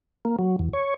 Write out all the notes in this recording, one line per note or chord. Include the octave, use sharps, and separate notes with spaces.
A#3
F#3
E2
C#5